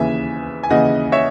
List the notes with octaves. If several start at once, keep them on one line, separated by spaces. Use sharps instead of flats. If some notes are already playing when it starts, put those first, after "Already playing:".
Already playing: D#2 C#3 E3 E5 G#5
G#5
D#2 C#3 E3 D#5 F#5
C#5 E5